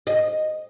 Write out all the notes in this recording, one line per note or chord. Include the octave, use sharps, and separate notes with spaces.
D#5